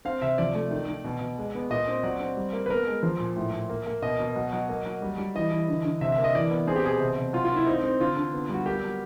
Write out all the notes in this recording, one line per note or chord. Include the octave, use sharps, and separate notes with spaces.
C4 F5
C3 E5
F3 D5
A3
D#3
D#3
B2
B2
G#3
B3
A#2 D#5
C4
F#3 D5
C4
G3
A#3
B4
B3 A#4
G#3
F3
A#2
A2
A2
A#3
A#3
B2 D#5
B2
F#3
F#3
A#3
F#3
G3
G3
E3 D#5
E3
D3
D3
C3 E5
E5
A#3
D#5
E3 D5
B3
C4 G#4
G4
B2 G#4
C3
C3
F#3 F4
F4
D#3
E4
C4 D#4
C4
D3 F4
D3
B3
G3 F#4
A#3 G4
F#3